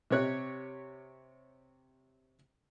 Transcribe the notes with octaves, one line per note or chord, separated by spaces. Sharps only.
C3 G4 C#5 F#6